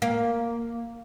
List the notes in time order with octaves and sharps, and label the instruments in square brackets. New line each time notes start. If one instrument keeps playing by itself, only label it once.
[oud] A#3